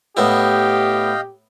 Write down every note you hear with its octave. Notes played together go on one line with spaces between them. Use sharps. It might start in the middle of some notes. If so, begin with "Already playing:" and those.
A2 B3 E4 G4 D#5 F5 G5